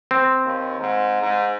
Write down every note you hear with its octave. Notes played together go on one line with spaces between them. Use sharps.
C4
D#2
G#2
G#2